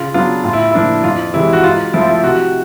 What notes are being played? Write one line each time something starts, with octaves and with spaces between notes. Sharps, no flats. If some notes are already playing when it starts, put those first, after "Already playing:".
Already playing: C#3 F4
F#3 B3 D4 F4
A2 F4
E4
F3 A#3 D4 E4
F2 F4
C3 E3 G#3 E4
F#4
G#2 F4
F3 A3 C4 E4
F4
E4
C3 F#4